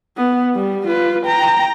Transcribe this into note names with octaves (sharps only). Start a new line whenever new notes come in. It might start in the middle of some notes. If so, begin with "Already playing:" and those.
B3
G3
F4 B4
G5 A#5